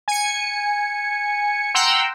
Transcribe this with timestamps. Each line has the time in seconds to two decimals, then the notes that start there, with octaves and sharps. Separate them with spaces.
0.08 G#5 C#7
1.75 F#5 G5 A#5 C6 E6